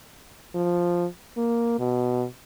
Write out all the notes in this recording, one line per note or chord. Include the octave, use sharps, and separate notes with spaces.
F3
A#3
B2